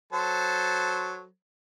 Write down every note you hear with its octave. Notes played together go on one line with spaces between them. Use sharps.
F#3 A4 C5